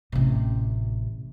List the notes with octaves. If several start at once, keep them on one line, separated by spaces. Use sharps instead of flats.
A1 C3